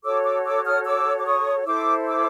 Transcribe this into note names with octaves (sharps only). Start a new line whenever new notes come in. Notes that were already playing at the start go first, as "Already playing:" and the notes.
F#4 A4 C#5 D6 E6
D6 E6
D6 E6
D#6 F6
D6 E6
D6
C#6 D#6
E4 A4 C5 D6 E6
D6 E6